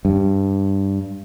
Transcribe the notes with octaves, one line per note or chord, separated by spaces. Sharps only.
G2